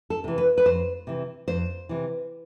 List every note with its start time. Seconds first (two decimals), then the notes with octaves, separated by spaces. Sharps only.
0.10 A4
0.24 C3 E3
0.38 B4
0.58 B4
0.65 F2 C5
1.07 C3 E3
1.48 F2 C5
1.89 C3 E3